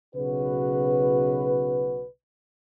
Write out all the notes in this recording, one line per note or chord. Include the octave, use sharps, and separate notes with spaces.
B1 C#3 F#4 B4